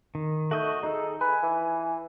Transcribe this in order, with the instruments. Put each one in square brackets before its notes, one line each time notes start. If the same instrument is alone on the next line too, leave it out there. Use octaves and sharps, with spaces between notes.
[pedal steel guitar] D#3
[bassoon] A3 [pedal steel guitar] F#4 D#5 G6
[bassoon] D#4 [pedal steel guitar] G#4 A4
[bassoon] B4 [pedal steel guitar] G#5
[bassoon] E3